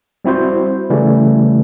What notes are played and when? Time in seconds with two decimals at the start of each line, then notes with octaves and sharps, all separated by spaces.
0.25 G3 C4 E4 F#4 C5
0.90 C#3 E3 G3 A3